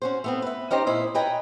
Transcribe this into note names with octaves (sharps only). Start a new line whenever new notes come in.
C#4 F#4 C5
A3 B3 C4
B4 E5
C#4 D#4 G4 C5 A#5
A#2 E4 C5 D#5
B4 C#5 D#5 G5 G#5 A#5